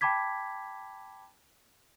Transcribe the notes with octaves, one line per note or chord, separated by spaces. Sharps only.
G5 A5 B5 D6 G#6 B6